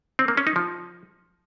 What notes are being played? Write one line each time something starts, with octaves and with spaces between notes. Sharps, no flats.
C4
A#3
C#4
D#4
F3